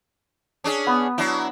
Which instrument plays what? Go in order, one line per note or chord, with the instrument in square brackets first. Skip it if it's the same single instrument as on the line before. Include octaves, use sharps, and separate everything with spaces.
[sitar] C#4 D4 G#4
[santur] B3
[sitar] F#3 D4 E4